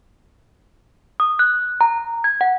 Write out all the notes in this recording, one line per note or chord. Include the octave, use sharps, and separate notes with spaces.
D#6
F#6
A#5
G#6
F#5